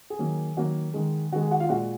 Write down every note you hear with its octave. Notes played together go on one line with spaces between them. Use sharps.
G#4
D#3 F#3 A#3
D#3 F#3 A#3 F#4
D#3 G#3
D#3 G#3 F#4
G#4
F#4 F#5
F4 F5
A#2 G#3 F#4 F#5